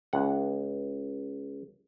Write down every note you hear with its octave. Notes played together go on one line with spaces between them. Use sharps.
C#2 F#5